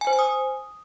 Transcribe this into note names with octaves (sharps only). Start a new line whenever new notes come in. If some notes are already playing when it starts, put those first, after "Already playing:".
G#5
C5
G#5
D#6